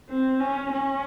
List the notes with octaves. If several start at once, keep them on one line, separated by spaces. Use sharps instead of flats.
C4
C#4
C#4